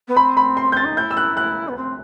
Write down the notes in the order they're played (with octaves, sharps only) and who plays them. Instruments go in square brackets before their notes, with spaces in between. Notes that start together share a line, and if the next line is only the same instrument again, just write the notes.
[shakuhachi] B3
[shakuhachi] C4 [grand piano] B5
[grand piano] B5
C6
G6
A6
[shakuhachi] D#4
[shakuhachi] E4 [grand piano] G6
[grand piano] E6
F#6
F#6
[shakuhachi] B3
C4